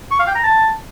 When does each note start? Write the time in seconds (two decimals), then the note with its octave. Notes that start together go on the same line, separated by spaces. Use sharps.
0.11 C#6
0.19 F5
0.27 G5
0.35 A#5
0.44 A5